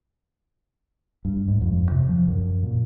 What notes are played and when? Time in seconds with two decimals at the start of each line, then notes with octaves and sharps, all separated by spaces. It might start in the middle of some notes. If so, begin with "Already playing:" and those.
1.25 G2
1.48 G#2
1.61 F2
1.91 C3
2.09 F3
2.28 F#2
2.63 A#2